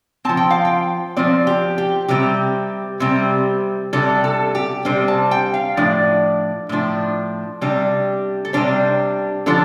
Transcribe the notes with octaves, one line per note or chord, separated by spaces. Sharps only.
F3 C4 A5
G5
F5
G5
F3 C4 D5
G4
G4
C3 G3 C4 G4
C3 G3 C4
C3 G3 D4 A4
A4
G4
C3 G3 D4 C5
A5
G5
F5
A2 F3 D4 D5
A2 F3 D4
C3 G3 D4
A4
C3 G3 D4 C5
D3 F3 D4 A4